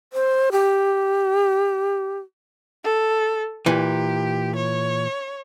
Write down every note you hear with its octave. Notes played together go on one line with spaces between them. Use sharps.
C5
G4
A4
A#2 E3 G4
C#5